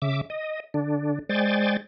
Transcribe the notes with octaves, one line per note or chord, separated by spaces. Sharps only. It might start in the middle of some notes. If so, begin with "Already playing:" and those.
C#3 E5 D6
D#5
D3 D4
G#3 C5 D5 G5 G#5 A6